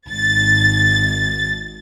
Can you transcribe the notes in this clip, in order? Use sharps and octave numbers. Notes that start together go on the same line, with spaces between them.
G#1 A6